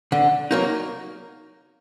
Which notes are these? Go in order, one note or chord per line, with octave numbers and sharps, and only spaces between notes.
D3
F#3 A#3 D#4